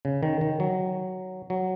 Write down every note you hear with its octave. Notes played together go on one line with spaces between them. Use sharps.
C#3
D#3
D#3
F#3
F#3